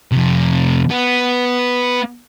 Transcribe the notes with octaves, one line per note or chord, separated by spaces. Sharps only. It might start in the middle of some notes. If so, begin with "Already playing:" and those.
F2 C3
B3